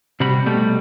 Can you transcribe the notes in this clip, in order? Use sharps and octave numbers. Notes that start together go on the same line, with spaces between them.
C3 G3 F#4 B5
B2 G3 A3